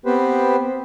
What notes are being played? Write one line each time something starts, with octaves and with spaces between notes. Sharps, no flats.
B3 C4 G4 B4 C5